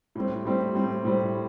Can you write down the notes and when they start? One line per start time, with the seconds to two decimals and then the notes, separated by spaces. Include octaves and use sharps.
0.15 A2 G3 C4
0.45 A2 G3 C4
0.75 A2 G3 C4
1.05 A2 G3 C4